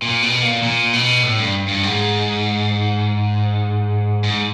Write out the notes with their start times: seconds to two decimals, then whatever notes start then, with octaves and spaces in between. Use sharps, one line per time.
0.02 A#2
0.23 B2
0.42 A#2
0.63 A#2
0.93 B2
1.23 A2
1.38 G2
1.68 G2
1.83 G#2
4.24 G#2